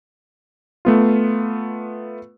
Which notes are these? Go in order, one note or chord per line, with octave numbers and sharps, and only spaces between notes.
A3 B3 F4